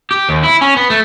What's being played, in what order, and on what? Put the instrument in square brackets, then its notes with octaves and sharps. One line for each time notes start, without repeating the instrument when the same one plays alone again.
[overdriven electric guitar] G4
D#2
E4
C#4
B3
A3